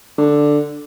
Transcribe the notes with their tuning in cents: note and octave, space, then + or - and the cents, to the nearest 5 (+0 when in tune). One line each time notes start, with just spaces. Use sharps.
D3 +5